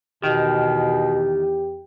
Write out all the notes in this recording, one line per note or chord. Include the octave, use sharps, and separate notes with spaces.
E2 B2 D#3 G4